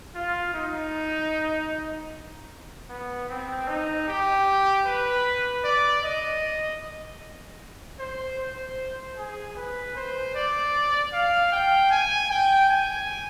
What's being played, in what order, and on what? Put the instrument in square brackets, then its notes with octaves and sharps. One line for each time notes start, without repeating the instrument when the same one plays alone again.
[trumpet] F4
D#4
B3
C4
D#4
G4
B4
D5
D#5
C5
C5
G#4
B4
C5
D5
F5
G5
G#5
G5
G#5